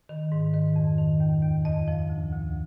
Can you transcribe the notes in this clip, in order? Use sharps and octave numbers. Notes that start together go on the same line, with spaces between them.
D#3
G#2
D#3
F2
D#3
D#2
D#2
F2 D#5
F3
D2
D2